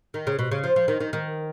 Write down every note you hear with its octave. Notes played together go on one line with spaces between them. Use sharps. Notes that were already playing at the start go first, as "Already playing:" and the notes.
D#3
C#3
B2
C#3
F3
F3
D#3
D#3
D#3